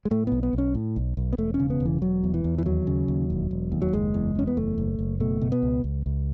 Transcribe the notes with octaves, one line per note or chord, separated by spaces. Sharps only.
G#3
A2 A3
B1 B3
B3
B1
C#4
A2
B1
B1
B3
E1 A3
C#4
C#3
B3
E1
E3
E1 F#3
E2
E3
E2
E3
D#2 F#3
C#3
D#2
E1
E1
D#2
F#3
F#1 G#3
E2
E2 C#4
B3
F#1 A3
F#1
F#1
B2 A3
B2
B3
C#2
C#2
C#2